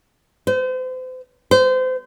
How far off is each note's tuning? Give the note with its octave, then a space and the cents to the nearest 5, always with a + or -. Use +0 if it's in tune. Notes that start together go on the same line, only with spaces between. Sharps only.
C5 -35
C5 -30